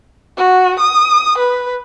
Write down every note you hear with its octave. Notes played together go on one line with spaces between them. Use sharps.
F#4
D#6
B4